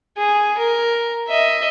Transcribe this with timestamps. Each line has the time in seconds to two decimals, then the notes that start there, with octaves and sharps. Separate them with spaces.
0.17 G#4
0.58 A#4
1.29 D#5 E5